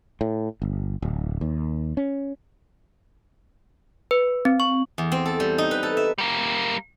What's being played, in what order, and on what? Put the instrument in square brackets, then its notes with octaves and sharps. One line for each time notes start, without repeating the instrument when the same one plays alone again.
[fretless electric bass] A2
G1
D1
D#2
C#4
[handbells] B4
C4
C#6
[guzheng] E2
C4
A4
G3
D#4
B4
A4
E5
[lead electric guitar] G3 A#3